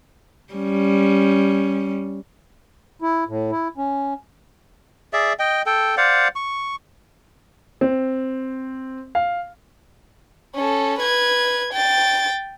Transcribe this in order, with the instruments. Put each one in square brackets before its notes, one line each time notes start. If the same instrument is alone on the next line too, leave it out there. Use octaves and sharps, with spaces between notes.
[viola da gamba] G3 C#4
[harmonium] E4
A2
E4
C#4
[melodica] G#4 D5 E5
D#5 G5
A4 G5
C5 D5 F5 F#5
C#6
[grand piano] C4
F5
[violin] C#4 A4
B4 G#6
G5 A6